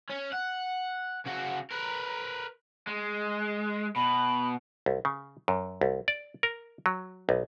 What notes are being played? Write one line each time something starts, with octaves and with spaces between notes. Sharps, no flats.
C#4
F#5
C#3 F#4
A#4 B4
G#3
B2 B5
C2
C#3
F#2
C2
D5
A#4
F#3
B1